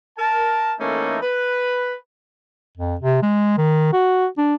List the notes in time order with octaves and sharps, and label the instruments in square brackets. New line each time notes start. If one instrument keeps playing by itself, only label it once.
[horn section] A#4 A5
E3 A3 A#3 C#4 D#4 A4
B4
[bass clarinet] F2
C3
G#3
D#3
F#4
D4